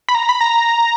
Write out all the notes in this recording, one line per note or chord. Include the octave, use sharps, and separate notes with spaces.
B5
A#5
B5
A#5